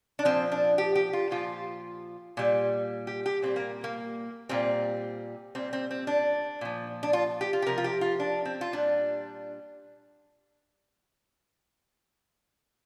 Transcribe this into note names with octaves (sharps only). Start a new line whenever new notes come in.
D4
A#2 F3 C4
D4
G4
G4
F4
A#2 F3 F4
A#2 G3
G4
G4
A#2 G3 C4
A#3
A#3
A#2 G3 C4
A#2 G3 C4
C4
C4
D4
A#2 F3
D4
F4
G4
F4
G4
C3 F3 A#4
F4
G4
F4
D4
C4
F4
A#2 G3 D4